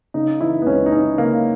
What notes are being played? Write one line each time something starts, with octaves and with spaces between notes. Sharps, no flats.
C#3 D#4
E3 E4
B3
C#2 C#4
D#4
C#2 C#4
C#3 A#3